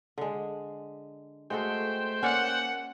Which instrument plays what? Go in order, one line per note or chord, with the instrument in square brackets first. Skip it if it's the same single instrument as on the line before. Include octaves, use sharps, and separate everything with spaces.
[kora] D3 G#3
[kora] G#3 F#4 A4 [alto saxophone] A3 [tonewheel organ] C5 G5
[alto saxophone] A#3 [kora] C#4 C#5 D5 [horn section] F#5